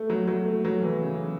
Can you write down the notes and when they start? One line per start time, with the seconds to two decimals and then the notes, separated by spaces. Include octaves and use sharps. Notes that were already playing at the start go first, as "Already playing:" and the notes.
Already playing: A3
0.10 F#3
0.28 F#3
0.46 A3
0.65 F#3
0.83 E3
1.01 C#3